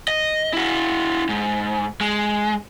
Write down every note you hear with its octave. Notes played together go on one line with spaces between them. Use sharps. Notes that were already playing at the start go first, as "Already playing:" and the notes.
D#5
E4 F#4
G#2
G#3